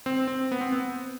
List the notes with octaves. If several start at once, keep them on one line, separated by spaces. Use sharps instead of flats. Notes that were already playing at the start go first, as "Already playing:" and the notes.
C4
C4
B3
C4
B3